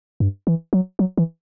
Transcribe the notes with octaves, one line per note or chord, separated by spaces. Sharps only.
G2
E3
F#3
F#3
E3